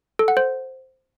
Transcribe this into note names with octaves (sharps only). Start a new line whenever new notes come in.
A4
F#5
C5